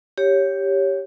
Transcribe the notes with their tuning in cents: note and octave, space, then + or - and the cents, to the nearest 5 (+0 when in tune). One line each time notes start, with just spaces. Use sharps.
G4 +0 C#5 +0